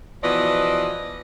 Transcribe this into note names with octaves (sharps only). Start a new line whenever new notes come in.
B2 E3 F3 B3 D5 D#5